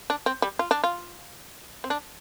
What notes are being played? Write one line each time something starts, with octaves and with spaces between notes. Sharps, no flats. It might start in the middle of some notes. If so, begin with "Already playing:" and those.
D4
C4
G3
F4
D4
F4
C4
D4